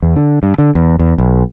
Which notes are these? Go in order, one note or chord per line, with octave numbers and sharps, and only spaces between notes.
E2
D3
G2
D3
E2
E2
B1